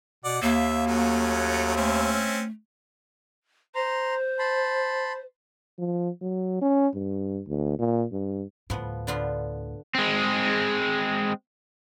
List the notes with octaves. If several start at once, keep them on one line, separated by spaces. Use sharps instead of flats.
B2 D5 F#5
D#2 A#3 E5
F#3 A3 C#4
A3 C4 C#4 E5
C5 A#5 C6
A5 B5 C6
F3
F#3
C#4
G2
D2
A#2
G2
D2 A2 F3 B3
D3 B3 F4
G#3 C4